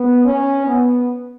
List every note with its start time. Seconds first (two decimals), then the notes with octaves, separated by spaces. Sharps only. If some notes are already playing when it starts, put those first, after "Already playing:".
Already playing: B3
0.25 C#4
0.65 B3